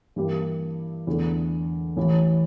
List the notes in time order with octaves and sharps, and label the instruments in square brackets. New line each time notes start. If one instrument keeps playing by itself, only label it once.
[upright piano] G2 E3 A#3 E4 G4
E2 D3 A3
A1 A2 E3